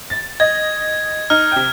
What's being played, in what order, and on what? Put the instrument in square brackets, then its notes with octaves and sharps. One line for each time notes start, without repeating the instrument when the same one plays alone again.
[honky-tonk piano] A6
[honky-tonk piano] D#5 [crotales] G#6
[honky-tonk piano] D#4 [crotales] F6
[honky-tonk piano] C3 G5